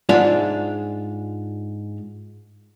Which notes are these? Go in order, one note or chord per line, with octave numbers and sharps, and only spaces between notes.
G#2 G#3 D4 F4 G#4 E5